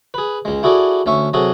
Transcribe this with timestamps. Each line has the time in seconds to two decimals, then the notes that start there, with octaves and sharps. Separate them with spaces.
0.14 G#4 B4
0.45 C#2 G#3
0.63 E4 F#4 G#4 A4 D5
1.06 D2 C#4 E5 C#6
1.33 C3 F#3 F#4 G#4 A4